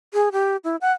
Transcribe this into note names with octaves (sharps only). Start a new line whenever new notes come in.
G#4
G4
E4
F#5